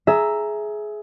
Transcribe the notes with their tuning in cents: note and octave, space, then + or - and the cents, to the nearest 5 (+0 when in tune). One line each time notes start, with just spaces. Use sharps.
G#4 +20 E5 +0 A#5 +0